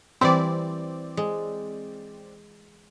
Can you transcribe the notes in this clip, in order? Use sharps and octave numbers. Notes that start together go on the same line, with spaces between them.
E3 G3 C4 E4 D5
G#3